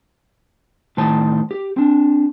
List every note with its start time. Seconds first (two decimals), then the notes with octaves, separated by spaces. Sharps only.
0.97 A2 D#3 C5 A5
1.51 G4
1.77 C4 D4